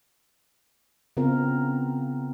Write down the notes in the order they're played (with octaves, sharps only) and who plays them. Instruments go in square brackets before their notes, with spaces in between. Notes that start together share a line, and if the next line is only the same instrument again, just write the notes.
[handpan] C#3 B3 C4 F4 A#4